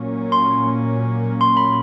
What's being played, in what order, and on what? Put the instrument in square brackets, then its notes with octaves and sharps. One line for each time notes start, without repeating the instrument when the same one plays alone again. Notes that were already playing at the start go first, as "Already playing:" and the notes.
Already playing: [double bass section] A#2 F#3 A#3 C#4
[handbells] C6
C6
B5